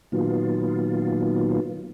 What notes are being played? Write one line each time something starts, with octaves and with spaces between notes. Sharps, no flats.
A#2 D#3 F#3 B3 F4